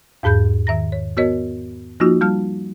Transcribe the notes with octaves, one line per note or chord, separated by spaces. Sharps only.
E2 G#2 G#4 B5 G6
D#3 E5 A#5 A#6
C#5
B3 F#4 A#4 C#5 D#5
F3 A#3 D#4 F4 F#4
G3 A5 F6